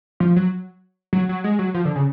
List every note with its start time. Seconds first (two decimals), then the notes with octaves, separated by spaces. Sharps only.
0.20 F3
0.36 F#3
1.13 F#3
1.29 F#3
1.44 G#3
1.59 F#3
1.74 F3
1.85 D3
1.95 C#3